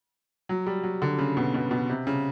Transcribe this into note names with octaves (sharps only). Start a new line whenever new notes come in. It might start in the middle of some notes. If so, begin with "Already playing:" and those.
F#3
G3
F#3
D3
C#3
B2
B2
B2
C3
C#3